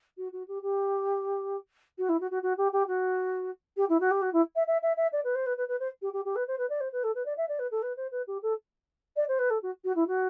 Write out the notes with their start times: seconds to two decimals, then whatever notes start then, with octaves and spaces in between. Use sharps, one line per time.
0.18 F#4
0.33 F#4
0.48 G4
0.62 G4
1.98 F#4
2.09 E4
2.21 F#4
2.31 F#4
2.43 F#4
2.58 G4
2.73 G4
2.88 F#4
3.77 G4
3.89 E4
4.00 F#4
4.11 G4
4.22 F#4
4.33 E4
4.56 E5
4.67 E5
4.82 E5
4.97 E5
5.13 D5
5.24 B4
5.35 C5
5.46 B4
5.57 B4
5.68 B4
5.80 C5
6.02 G4
6.13 G4
6.25 G4
6.36 B4
6.48 C5
6.58 B4
6.70 D5
6.81 C5
6.92 B4
7.04 A4
7.15 B4
7.26 D5
7.37 E5
7.49 D5
7.59 B4
7.71 A4
7.82 B4
7.97 C5
8.12 B4
8.27 G4
8.42 A4
9.16 D5
9.28 C5
9.39 B4
9.50 A4
9.63 F#4
9.84 F#4
9.96 E4
10.08 F#4